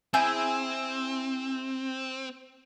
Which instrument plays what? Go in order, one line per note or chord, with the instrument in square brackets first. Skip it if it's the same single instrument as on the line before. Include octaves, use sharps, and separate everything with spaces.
[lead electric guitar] C4 [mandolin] E4 G#4 G6